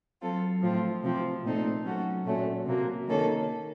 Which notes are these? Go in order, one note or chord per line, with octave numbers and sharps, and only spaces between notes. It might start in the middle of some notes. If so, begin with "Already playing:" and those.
F#3 C4 F4 A4
A2 F3 C4 F4
C3 F3 C4
A#2 A3 C4 D#4 A4
F#3 A3 C#4 F#4 A4
A#2 F#3 A3 C#4
C3 F#3 A#3
D#3 A#3 C#4 A4